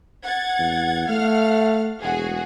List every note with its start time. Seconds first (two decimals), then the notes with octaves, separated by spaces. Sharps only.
0.24 F#5 G#6 A6
0.59 E2
1.09 A3 F5 F#5 F6
2.02 E1 F#4 G#4